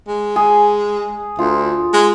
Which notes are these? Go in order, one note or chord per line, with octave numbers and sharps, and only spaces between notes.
G#3
G#4
D2 F4
G#3